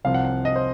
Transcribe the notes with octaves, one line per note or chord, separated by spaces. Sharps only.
C2 C3 F3 F5
F#5
F#5
D#5
C5